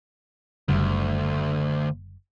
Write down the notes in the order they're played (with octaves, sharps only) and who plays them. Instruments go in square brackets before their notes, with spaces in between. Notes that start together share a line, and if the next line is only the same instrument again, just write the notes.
[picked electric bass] F#1 D3 G3 [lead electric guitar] D2